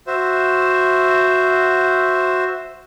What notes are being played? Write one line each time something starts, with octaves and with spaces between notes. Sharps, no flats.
F#4 C5 E5